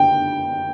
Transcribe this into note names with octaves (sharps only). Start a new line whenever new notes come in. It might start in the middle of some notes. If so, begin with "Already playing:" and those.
Already playing: G5